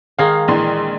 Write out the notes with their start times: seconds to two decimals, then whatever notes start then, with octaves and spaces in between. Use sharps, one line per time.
0.19 D#3 G#3 F5
0.48 A#1 E3 C6